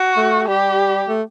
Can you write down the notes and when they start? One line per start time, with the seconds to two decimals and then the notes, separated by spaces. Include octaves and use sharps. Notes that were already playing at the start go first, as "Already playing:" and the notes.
Already playing: F#4
0.17 A3
0.48 G3 G4
1.08 A3